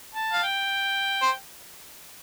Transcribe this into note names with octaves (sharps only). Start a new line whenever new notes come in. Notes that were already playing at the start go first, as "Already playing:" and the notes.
A5
F5
G5
C5